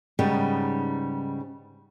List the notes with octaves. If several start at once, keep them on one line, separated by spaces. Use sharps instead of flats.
G#2 C#3 G3 B3 D#4